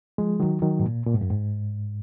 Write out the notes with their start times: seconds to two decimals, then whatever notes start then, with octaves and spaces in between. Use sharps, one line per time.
0.18 F3 G#3
0.40 D#3 F#3
0.62 D#3 F#3
0.79 G#2
0.84 A#2
1.06 A#2
1.14 G#2
1.21 F#2
1.30 G#2